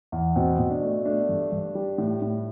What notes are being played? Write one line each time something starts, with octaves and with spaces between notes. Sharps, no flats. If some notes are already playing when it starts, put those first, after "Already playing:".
E2
B2 C4
B2
D4
A3
A3 D4
G2
G2
G3
A2
A2